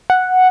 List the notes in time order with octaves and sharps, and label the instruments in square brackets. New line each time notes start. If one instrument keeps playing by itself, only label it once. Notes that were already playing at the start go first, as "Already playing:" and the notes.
[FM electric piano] F#5